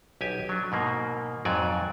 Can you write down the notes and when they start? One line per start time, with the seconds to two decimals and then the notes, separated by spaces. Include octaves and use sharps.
0.21 B1 G4 G#5
0.49 F#3 D4
0.72 G#2 B2 A#3
1.45 F2 G#2 F#3 D5 G#5